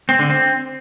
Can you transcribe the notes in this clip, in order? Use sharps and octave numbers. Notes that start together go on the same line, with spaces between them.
C4
D3
C4